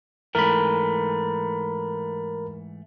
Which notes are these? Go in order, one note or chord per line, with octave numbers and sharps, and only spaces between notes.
G#2 E3 A3 A#4 B5